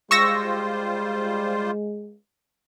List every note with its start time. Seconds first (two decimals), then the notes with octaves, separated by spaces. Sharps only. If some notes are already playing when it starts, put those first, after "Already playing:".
0.11 G3 G#3 F4 C5 C#6 E6 A#6